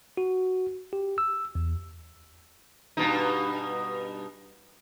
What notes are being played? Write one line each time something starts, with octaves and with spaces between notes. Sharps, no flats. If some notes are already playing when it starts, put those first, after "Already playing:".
F#4
G4
E6
E2
G2 B2 D#4